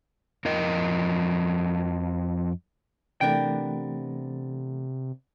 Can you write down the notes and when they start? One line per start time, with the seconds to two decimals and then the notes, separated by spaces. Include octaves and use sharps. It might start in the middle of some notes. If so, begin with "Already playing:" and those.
0.45 F2 F3 A#4 D#5
3.21 C3 E3 A3 B3 D4 A#4 G5